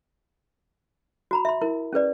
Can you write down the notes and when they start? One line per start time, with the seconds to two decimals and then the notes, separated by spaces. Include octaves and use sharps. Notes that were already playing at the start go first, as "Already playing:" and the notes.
1.31 F#4 A#5 B5
1.45 E5 C6
1.61 E4 A#4
1.93 C#4 G#4 B4 D5